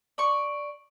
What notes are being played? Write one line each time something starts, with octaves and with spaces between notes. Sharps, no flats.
D5 C#6